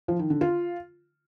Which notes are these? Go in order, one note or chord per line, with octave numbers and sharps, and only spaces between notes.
F3
D#3
D3
F4